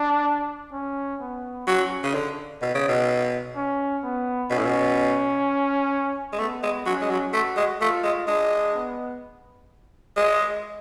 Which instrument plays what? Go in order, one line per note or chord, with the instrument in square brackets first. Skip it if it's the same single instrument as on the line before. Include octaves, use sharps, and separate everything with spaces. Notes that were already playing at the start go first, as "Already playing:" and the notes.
Already playing: [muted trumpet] D4
C#4
B3
[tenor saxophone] F#3 [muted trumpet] C#4
[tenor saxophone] C#3
D3
B2
C#3
B2
[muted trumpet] C#4
B3
[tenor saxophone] B2 [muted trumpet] C#4
[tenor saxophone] A2
B2
G#3
[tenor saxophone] A3 [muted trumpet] B3
[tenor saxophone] G#3
[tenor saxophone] F#3 [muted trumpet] C#4
[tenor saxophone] G#3
F#3
[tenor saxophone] A3 [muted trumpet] F#4
[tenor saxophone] G#3
[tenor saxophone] A3 [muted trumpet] F4
[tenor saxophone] G#3
[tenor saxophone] G#3 [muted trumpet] D4
[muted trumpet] B3
[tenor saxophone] G#3